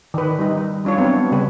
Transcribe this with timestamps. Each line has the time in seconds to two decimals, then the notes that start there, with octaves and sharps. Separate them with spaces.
0.14 D#3 B4
0.39 G3 D#4
0.85 G3 D4 F4 C#5
0.98 F#3 B3 C4 D4
1.32 C#3 G3 G#4 B4